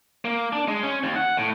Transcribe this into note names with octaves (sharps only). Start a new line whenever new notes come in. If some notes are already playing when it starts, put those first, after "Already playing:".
A#3
D4
G#3
C#4
D#2
F#5
A2